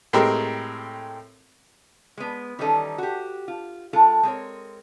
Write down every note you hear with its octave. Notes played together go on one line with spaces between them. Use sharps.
A2 G#3 C4 G4 A#4
G#3 B3
D#3 E3 G3 C#4 D#4 A4
F#4 G4
F4
G#3 F4 A4
G#3 C4 A#4 C#5